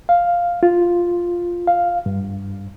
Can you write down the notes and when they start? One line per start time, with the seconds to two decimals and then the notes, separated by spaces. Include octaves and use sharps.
0.09 F5
0.63 F4
1.67 F5
2.06 G2